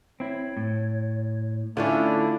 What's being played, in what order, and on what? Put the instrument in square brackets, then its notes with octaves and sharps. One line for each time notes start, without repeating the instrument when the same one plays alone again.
[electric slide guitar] C4 E4 [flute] C#5
[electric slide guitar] A2
[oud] D3 A3 C#4 [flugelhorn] D4 [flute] E4 [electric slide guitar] F4